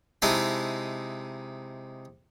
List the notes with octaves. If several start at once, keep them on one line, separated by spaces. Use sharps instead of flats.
C3 G#3 D#4 E4 D#5 A5